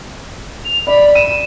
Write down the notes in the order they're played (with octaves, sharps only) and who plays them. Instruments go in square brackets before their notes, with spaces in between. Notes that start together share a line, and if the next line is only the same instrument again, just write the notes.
[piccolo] F7
[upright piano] D5 [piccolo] B5
[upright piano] D#7 [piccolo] E7